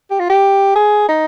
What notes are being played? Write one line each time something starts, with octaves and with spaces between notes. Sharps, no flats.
G4
F4
G4
G#4
D#4